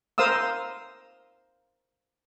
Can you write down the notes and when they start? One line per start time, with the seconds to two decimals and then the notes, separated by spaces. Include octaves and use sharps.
0.18 A#4 C5 F5 D#6 E6